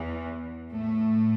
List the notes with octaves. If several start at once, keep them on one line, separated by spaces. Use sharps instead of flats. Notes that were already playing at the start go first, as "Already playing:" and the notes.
Already playing: E2 E3
A2 A3